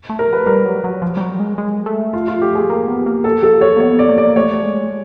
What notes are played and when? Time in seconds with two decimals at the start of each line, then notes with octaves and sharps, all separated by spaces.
0.09 A3
0.19 A#4
0.33 B4
0.46 G3 A#4
0.65 F#3
0.84 F#3
1.02 F3
1.17 G3
1.20 F#3
1.40 G#3
1.58 G#3
1.86 A3
2.13 F4
2.28 F4
2.42 G4
2.55 G#4
2.70 A#3
2.87 B3
3.06 A#3
3.24 A4
3.43 A4
3.61 C#5
3.77 A#3
3.80 B3 C#5
3.99 D5
4.09 A#3
4.18 D5
4.36 A3 C#5
4.63 G#3